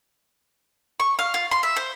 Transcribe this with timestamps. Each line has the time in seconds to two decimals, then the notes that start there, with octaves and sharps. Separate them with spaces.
1.00 C#6
1.19 F5
1.34 F4
1.51 C6
1.63 E5
1.76 C5